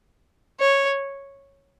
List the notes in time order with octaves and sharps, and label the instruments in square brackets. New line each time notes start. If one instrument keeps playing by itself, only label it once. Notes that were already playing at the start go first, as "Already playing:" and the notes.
[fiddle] C#5